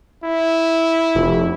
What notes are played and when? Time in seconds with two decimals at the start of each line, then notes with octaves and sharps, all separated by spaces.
0.24 E4
1.15 F1